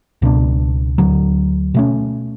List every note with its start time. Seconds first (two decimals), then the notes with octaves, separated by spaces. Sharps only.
0.22 C#2 B2 A3 D4
0.98 D2 D3 F#3
1.74 B2 A3 C#4